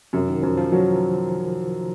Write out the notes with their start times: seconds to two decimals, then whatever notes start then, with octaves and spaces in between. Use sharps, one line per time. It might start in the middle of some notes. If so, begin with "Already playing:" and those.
0.13 F#2 C3
0.29 D#3
0.42 F#2 F3
0.57 F3
0.72 F#3